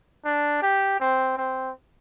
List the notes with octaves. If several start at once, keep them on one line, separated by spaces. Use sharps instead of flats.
D4
G4
C4
C4